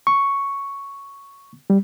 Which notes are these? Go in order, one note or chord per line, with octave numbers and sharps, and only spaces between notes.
C#6
G3